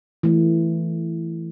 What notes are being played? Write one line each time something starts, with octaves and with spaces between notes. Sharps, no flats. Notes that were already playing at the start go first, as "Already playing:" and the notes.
E3 A3